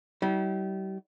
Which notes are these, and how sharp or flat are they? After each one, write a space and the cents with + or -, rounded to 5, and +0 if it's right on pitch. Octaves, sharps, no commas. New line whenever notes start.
G3 -35 E4 -40